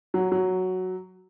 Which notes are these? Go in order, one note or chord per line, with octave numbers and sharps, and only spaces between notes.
F#3
F#3